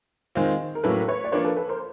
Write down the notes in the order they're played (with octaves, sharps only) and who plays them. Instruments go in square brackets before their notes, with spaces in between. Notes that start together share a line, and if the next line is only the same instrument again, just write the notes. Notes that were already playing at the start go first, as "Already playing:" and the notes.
[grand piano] D#3 G#3 C4 F4
[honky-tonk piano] A#4
[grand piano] A2 F#3 A#3 C#4 E4 [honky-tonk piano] A4 B4
[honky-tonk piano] B4 C#5
D5
[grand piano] F3 A#3 D4 [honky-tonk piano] B4 C#5
[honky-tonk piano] A4 B4
A4 B4
A#4 C5